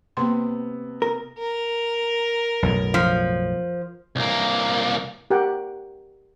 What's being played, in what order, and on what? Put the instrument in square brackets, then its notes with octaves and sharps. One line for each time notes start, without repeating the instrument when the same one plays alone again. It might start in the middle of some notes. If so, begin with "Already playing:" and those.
[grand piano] C3 B3 [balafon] A#3 C6
[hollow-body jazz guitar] A#4
[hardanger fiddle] A#4
[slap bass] B1 F#2 A2
[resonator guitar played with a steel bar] F3
[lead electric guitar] C2 A#3
[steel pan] G4 A#4 F#5 G5